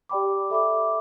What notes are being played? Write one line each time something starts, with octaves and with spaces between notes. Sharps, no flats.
G4 D5 G5 B5 D6
A4 E5 B5 D6